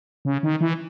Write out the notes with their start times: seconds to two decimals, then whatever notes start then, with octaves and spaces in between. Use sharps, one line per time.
0.25 C#3
0.43 D#3
0.61 E3